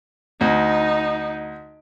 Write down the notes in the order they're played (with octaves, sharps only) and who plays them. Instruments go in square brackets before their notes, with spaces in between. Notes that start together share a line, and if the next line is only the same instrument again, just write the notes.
[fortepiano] D2 [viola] D#4